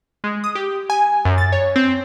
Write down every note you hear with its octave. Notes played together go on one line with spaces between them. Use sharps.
G#3
D#6
G4
G#5
F#2
A6
C#5
C4